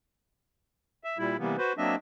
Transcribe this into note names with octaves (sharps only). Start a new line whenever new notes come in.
E5
A#2 G3 E4
C3 E3 G3 A#3 B3
F#4 B4 C5
F#3 A#3 C4 D4 D#5 E5